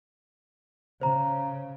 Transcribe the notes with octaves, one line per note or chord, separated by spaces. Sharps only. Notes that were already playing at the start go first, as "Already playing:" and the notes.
C#3 C5 A#5